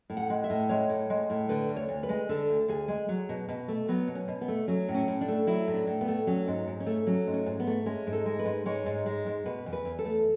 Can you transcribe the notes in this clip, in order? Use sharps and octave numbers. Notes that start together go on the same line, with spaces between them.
A2
F#5
G#3
E5
A2
G#3 C#5
A2
G#3
A2
D3 B4
D2
C#5
D2
B4
G#3
D3 A4
D2
D2 G#4
G#3
F#3
B2
B2
A3
F#3 B3
B2
C#4
B2
B3
A3
F#3 C#4
A2
C#4
A2
D4
A3
F#3 E4
A2
D4
A2
B3
A3
F#3 C#4
G#2
G#2
C#4
A3
F#3 C#4
G#2
C#4
G#2
B3
A3
G#3 C#4
G#2
A4
G#3
B4
G#2
G#3 C#5
G#2
G#3
G#2
B2 B4
E2
B4
E2
A4
A3